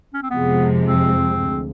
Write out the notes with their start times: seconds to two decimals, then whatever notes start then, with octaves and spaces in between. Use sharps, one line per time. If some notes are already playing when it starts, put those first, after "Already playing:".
0.14 C#4
0.23 C4
0.30 F2 C3 F3 G#3 B3
0.87 C4
1.42 D2